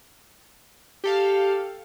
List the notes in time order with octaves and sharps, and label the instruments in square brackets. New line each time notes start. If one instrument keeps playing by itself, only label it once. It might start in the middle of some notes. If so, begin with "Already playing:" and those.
[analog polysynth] G4 A4 F5